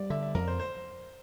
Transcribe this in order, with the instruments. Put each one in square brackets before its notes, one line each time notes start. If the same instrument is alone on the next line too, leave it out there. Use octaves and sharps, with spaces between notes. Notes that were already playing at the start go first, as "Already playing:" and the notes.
Already playing: [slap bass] G3 [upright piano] D5
[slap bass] D3 [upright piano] E5
[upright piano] E5
[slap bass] F2 [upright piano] A#4
[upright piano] C5
C5